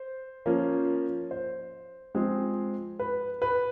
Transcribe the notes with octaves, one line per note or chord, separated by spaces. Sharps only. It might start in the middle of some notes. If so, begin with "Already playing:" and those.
Already playing: C5
F3 A#3 C#4
C5
F3 G#3 C4
B4
B4